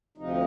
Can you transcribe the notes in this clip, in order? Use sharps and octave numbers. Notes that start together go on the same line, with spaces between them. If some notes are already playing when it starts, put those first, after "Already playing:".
D2 C3 F3 D#4